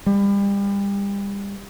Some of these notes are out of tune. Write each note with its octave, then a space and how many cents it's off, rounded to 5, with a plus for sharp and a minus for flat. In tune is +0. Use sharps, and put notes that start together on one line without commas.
G3 +35